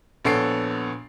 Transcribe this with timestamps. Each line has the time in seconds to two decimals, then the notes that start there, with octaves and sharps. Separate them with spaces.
0.25 A#1 B3 A4 C#5 C7 D7